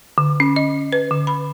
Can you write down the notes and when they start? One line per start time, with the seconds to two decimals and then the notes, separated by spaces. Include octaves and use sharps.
0.18 D3
0.40 C#4
0.56 D#5
0.92 B4
1.11 D3
1.27 B5